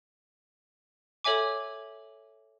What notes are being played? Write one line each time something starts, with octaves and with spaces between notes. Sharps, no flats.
A4 C#5 E5 G#5 D6